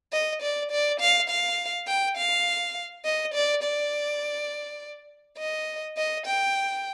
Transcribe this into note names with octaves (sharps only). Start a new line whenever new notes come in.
D#5
D5
D5
F5
F5
G5
F5
D#5
D5
D5
D#5
D#5
G5